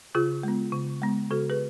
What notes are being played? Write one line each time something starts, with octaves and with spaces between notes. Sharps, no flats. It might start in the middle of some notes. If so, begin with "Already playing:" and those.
C#3 F4 G#4
G#3 B3
C#3
G#3 B3
C#3 F#4 A4
G#4 B4